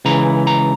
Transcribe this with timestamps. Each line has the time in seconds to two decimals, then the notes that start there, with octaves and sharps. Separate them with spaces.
0.05 C#2 C#3 E3 A#5
0.47 A#5